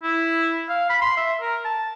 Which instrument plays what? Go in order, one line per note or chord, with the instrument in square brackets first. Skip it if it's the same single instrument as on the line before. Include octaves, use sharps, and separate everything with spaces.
[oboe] E4
F5
B5
C6
E5
A#4
A5